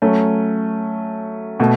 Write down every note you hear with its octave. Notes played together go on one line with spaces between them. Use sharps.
F#3 A3 C#4
B2 A3